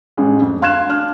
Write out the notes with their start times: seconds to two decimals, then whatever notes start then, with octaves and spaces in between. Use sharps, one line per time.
0.17 A1 G#3
0.41 F2
0.62 D2 F5 C6 F#6 G#6 E7
0.89 D4 F6